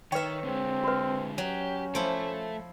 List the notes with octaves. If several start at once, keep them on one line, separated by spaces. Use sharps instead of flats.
D#3 B4 C#5 E5 G5
D3 G#3 C4
F#4 B4
F#3 C#4 G4
F3 A3 E4 A4